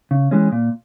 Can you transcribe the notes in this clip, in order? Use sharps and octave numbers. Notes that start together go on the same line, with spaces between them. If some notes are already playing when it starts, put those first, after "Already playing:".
C#3
E3 G#3 C#4
A#2